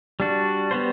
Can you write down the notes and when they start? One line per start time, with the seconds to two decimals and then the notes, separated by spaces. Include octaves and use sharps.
0.20 G3 D4 F#4
0.71 G3 B3 F#4 C5